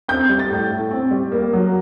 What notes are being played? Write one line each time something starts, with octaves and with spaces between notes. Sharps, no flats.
C4 G6
G3
A6
A2
A2
C4
G3
A#3
F#3